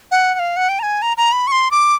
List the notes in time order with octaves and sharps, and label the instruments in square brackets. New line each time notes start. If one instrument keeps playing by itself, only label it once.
[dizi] F#5
F#5
F5
F#5
G5
A#5
G#5
A#5
A#5
B5
C#6
C6
D6